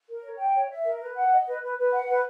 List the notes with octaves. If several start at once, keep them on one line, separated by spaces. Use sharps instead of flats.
A#4
C#5
G5
C#5
E5
A#4
B4
F#5
D#5
B4
B4
B4
F#5
B4